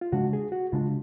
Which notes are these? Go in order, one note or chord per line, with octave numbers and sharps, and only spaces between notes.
F4
C#3 G#3 D4 F#4
G#4
F#4
C#3 G#3 D4 F4